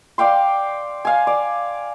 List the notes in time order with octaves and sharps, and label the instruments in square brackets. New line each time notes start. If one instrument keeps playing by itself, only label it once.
[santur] D5 F5 G5 C6
F5 G#5
D5